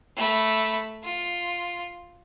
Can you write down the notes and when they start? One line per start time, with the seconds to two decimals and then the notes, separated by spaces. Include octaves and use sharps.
0.16 A3 B5
1.03 F4